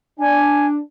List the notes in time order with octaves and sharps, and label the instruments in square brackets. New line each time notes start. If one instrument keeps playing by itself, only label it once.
[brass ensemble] D4 [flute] G#5